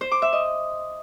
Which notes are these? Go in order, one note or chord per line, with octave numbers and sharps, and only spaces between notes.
C5
D6
E5
D#5